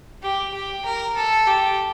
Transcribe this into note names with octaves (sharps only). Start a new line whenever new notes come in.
G4
G4
A#4
A4
G4